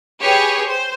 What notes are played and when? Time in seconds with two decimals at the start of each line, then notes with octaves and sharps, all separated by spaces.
0.22 G4 G#4 B4 C#5
0.66 C5